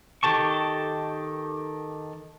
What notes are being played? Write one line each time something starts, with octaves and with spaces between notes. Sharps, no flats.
D#3 G4 A4 A5 C#6